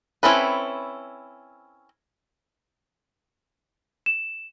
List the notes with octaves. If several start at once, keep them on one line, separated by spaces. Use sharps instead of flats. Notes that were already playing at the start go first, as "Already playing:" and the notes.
C4 C#4 E4 A4 B4
E7